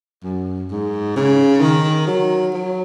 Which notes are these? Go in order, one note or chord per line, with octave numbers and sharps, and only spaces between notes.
F#2
G#2
C#3
D#3
F#3
F#3